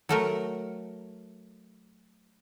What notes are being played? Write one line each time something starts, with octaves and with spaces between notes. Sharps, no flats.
F#3 A3 A#4